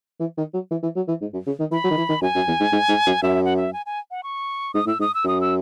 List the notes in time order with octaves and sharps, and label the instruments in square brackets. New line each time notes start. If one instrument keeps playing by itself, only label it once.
[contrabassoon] E3
D#3
F#3
E3
E3
F#3
E3
G#2
F#2
C#3
D#3
[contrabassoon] E3 [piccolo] B5
[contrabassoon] F#3
D#3
E3
D#3
[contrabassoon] F#2 [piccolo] G#5
[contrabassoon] F#2
E2
G#2
G#2
G#2
F#2
[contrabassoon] F#2 [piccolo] E5
[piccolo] F#5
E5
G#5
G#5
F#5
C#6
[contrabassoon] G#2 [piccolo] D#6
[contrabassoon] A2 [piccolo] E6
[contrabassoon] G#2 [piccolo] D#6
[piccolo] E6
[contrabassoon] F#2 [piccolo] D#6
[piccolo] E6